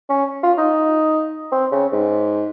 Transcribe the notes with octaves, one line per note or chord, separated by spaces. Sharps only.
C#4
F4
D#4
C4
C#3
G#2